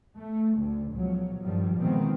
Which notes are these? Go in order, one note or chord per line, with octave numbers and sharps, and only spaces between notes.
A3
D2 D3
C#2 B2 F3 F#3
G2 D#3 F3 G3
B2 D#3 E3 G#3 B3 C4